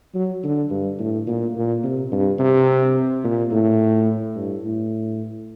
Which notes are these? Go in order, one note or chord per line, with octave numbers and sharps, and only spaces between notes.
F#3
D3
G2
A2
A#2
A#2
C3
G2
C3
A#2
A2
G2
A2